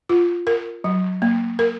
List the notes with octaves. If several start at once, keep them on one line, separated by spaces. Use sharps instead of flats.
F4
A#4
F#3
A#3
A#4